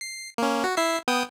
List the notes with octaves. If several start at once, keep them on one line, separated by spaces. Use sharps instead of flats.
C7
A#3 C#4
F#4
E4 E5 C7
B3 G5 D#6